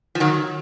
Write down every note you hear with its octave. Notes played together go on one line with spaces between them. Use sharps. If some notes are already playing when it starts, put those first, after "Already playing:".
F3
D#3 F#3